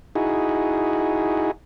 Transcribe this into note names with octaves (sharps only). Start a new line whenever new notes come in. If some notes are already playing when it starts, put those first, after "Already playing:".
D#4 E4 F#4 G#4